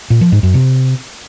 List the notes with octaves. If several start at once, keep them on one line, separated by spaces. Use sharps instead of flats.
A#2
F3
G#2
F#2
C3